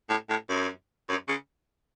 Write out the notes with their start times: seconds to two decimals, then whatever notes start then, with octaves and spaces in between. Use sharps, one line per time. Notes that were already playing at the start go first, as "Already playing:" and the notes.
0.09 A2
0.29 A2
0.49 F#2
1.09 F#2
1.28 C#3